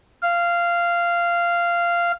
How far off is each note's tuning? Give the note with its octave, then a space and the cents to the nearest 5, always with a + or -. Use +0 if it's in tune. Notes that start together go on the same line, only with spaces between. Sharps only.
F5 -15